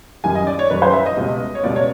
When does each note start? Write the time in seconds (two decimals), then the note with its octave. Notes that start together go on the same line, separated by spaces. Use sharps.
0.24 F#2 D#3 G3 G#5
0.35 D#5
0.47 D5
0.59 C#5
0.70 F#2 D#3 G3 B4
0.82 C5
0.93 E5
1.06 D#5
1.16 C#2 B2 G3
1.55 C#5
1.64 C#2 B2 G3 D5
1.76 C#5